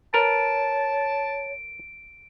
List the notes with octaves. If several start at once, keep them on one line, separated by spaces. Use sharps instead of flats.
A#4 B4 C#5 A5 D7